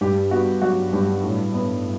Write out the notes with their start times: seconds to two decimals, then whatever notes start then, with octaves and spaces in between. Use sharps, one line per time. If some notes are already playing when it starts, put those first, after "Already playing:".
0.01 G2 G4
0.31 B3 F#4
0.62 F#3 F#4
0.93 G2 G4
1.23 A2
1.54 B3